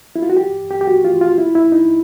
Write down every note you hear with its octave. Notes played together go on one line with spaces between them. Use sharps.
E4
F4
F#4
G4
G4
G4
F#4
F4
F4
E4
E4
D#4